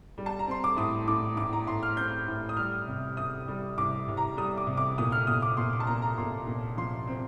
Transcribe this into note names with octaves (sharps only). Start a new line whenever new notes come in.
G3
A5
A#5
C4 C6
D6
A2 D#6
A2 D6
A2 D6
A#5
A2 C6
F6
C4 G6
A2
D#6
G3 F6
C3
C3 D#6
G3
C2 D6
C2
A#5
G3 D#6
D6
C3
D6
A#2 D#6
F6
A#2 D#6
D6
A#2 C6
D6
A5
A#2 A#5
A#5
A#2 C6
A#2
F3 C6
C4